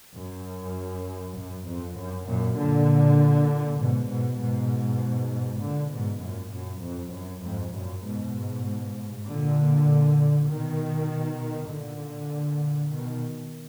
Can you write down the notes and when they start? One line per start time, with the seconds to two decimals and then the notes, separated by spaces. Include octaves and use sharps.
0.15 F#2
1.36 F#2
1.67 F2
1.96 F#2
2.28 F#2 A#2
2.58 A#2 D3
3.79 G#2 B2
4.09 G#2 B2
4.39 G#2 B2
5.61 A#2 D3
5.91 G#2 B2
6.22 F#2 A#2
6.53 F#2
6.82 F2
7.13 F#2
7.43 F2 G#2
7.74 F#2 A#2
8.04 G#2 B2
9.25 A#2 D3
10.47 B2 D#3
11.68 A#2 D3
12.90 B2 D#3